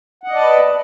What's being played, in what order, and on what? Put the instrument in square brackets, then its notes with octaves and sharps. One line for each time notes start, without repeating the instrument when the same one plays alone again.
[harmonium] F#5
D#5
D5
A5
B4